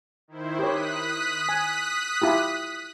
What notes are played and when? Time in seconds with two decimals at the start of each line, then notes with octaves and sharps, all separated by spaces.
0.28 D#3 E4 C5
0.59 G4 C#5 D#6 F#6 B6
1.49 G#5
2.22 E4 F4 G4